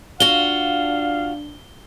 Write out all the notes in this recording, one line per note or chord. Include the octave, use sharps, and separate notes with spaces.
D4 F4 F#4 F5 G7